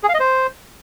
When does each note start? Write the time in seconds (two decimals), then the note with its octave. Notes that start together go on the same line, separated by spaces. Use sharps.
0.03 G#4
0.09 F5
0.14 D#5
0.20 C5